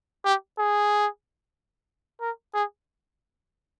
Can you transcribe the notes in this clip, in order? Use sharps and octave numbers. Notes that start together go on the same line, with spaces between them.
G4
G#4
A#4
G#4